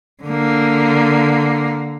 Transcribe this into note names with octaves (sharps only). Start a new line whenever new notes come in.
D3 A#3